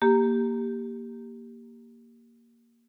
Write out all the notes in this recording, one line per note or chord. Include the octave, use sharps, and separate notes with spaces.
A#3 G4